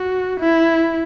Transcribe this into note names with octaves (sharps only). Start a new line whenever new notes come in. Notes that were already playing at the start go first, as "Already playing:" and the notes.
Already playing: F#4
E4